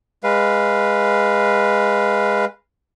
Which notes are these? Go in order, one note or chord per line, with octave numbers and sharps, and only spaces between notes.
G#3 B4 F5